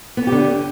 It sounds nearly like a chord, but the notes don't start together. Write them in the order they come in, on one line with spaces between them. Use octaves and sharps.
B3 C#4 G4 D3